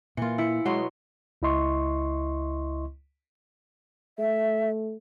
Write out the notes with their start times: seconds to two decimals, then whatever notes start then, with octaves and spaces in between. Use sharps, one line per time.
0.17 A#2 E3 A#3 F4 C#7
0.38 E4 C#7
0.65 B2 F#3 G#3 B3 C6
1.42 C#2 E4 D#5 C6 C#6
4.19 A3 E5